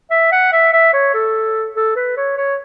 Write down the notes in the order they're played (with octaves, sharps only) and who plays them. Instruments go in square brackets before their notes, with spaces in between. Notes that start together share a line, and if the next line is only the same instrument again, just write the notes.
[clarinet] E5
F#5
E5
E5
C#5
A4
A4
B4
C#5
C#5